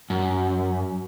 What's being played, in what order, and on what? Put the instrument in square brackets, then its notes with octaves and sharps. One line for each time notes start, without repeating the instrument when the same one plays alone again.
[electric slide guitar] F#2